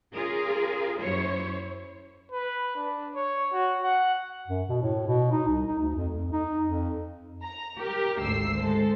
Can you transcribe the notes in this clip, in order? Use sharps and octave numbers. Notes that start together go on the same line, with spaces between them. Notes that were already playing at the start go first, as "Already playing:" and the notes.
C#4 F4 G#4 A#4
F#2 E4 C5 C#5
B4
D4
C#5
F#4
F#5
F#2
B2
A2
B2
D#4
C2
D#4
D2
F2
F2
D#4
F2
A#5
G4 A#4
G#1 D2 E6 C7
G#3 A4 C5